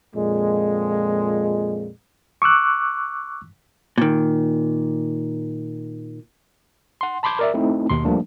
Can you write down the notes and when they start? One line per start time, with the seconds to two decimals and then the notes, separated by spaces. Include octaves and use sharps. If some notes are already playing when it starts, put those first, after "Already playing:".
0.15 F2 A#2 G#3
2.42 C#6 D6 E6 F#6
3.98 A#2 D#3
7.01 F#5 C6
7.23 A5 B5 C6 D6 G6 G#6
7.39 A#4 D5 E5
7.54 A3 C4 D#4 E4
7.90 D#2 B2 C6
8.05 F3 G3 A3 A#3 D4